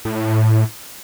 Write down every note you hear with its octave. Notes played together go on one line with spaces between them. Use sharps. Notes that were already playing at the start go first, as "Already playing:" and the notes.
A2